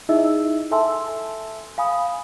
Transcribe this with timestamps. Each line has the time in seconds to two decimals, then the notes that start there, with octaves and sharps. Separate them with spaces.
0.09 D#4 E4 G#4 D#5 E5 E6
0.71 A4 E5 G#5 A5 C6 E6
1.78 F5 G#5 B5 D#6